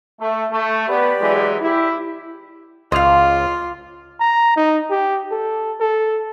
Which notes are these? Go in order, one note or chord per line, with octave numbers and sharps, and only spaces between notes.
A3
A3
B3 G4 B4 D5
E3 F#3 G#3
E4 G4
C#2 F4 D#5 F5 C6 D6 F7
A#5
D#4
G4
A4
A4